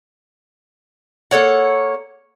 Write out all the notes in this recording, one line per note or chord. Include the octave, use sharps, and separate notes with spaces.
A#3 A4 C#5 F#5